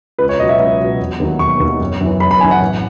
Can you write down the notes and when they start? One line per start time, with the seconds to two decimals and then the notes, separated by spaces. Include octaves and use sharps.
0.19 C#2 B4
0.29 C#5
0.39 B2 D#5
0.42 F#3
0.49 E5
0.60 C#2
0.80 B2 F#3
1.00 E1
1.20 D#2 D#3 F#3
1.39 E1 C#6
1.60 D#2 D#3 F#3
1.80 F#1
2.01 F#2 E3
2.20 F#1 B5
2.31 B5
2.41 F#2 E3 G#5
2.51 F#5
2.61 A1